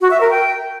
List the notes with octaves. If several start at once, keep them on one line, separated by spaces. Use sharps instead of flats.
F#4
E5
A#4
G5